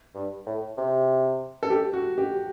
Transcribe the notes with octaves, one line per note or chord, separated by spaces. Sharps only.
G2
A2
C3
A4
G4
F#4
G4